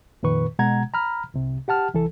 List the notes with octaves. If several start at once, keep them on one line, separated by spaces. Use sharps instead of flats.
F2 A#2 D#3 B4 C#6
B2 G#3 F#5 A#5 G#6
A#5 B5 F6
C2 C3
G4 F#5 A5 F6
C2 E3 A4